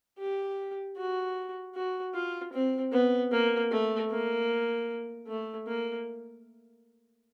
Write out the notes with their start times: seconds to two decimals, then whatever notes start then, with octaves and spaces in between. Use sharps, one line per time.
0.19 G4
0.97 F#4
1.75 F#4
2.14 F4
2.53 C4
2.93 B3
3.32 A#3
3.71 A3
4.11 A#3
5.27 A3
5.67 A#3